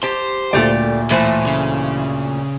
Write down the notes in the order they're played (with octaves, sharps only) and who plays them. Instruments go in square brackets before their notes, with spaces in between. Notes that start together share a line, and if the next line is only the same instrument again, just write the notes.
[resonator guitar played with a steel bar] G4 A5 [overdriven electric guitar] C5
[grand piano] D2 A#2 [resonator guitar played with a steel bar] A3 G4 D5
[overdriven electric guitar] A2 [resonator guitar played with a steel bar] E3 A3 C5
[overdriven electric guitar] C#3